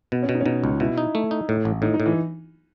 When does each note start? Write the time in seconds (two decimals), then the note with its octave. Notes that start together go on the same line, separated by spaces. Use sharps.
0.12 B2 B3
0.23 C#4
0.29 B2
0.35 D#4
0.40 C#4
0.46 B2 D#4
0.64 C#2
0.80 B2 E4
0.98 D#4
1.15 A3
1.31 D#4
1.49 A2
1.65 A1
1.82 A2 D#4
1.94 D#4
2.00 A2
2.06 E3